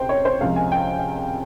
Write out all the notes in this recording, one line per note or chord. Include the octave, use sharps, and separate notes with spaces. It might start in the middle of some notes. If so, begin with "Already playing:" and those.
Already playing: C#2 C3 C5 G5
C#5
C5
C#2 C3 F3 F5
G#5
G5